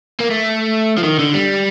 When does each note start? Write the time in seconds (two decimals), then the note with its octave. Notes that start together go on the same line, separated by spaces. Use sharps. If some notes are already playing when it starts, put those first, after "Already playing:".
0.20 A#3
0.30 A3
0.98 F3
1.04 D#3
1.19 D3
1.34 G3